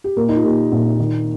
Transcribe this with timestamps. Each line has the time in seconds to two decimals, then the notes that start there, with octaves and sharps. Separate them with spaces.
0.04 G4
0.16 A#2 A#4
0.29 D#4
0.36 F4
0.44 A#2 G4
0.72 A#1
0.99 D#3